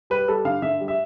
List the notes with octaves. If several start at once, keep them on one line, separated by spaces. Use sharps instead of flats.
G3 B4
G3 A4
D3 F5
D3 E5
G3
E5